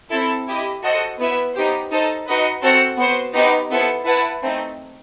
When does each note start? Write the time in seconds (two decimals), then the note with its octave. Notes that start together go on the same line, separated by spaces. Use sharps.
0.10 C4 E4 A4
0.47 E4 G4 D#5
0.83 F#4 A4 C5 D#5 F#5
1.19 B3 E4 B4 E5
1.54 B3 D#4 G4 C5
1.90 D#4 A4 C5
2.27 D#4 F#4 B4 D#5
2.62 C4 F#4 A4 C5 F#5
2.97 B3 F#4 C5
3.34 B3 D#4 G4 C5
3.70 B3 E4 A4 C5
4.05 E4 B4 F#5 A5
4.42 A3 C4 D#4